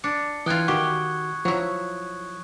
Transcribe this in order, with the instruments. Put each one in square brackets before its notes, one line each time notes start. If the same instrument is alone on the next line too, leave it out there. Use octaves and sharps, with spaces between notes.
[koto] D4 [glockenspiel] C#7
[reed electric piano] E3 [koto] F4 G5 [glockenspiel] D#6 F#6 G#6
[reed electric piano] D#3 F#4 F#5 [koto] G4 [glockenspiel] C#6
[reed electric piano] F3 [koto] F#3 E4